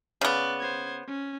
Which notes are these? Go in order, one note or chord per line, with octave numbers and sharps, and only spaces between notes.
C#3 B3 D5 F#6
C5 G#6
C#4